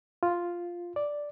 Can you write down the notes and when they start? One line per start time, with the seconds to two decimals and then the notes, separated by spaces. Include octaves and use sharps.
0.23 F4
0.96 D5